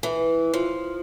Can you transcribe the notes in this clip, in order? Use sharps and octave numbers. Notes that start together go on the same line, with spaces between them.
E3
F3